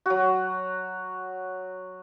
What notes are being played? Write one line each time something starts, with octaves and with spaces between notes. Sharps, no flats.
F#3 F#4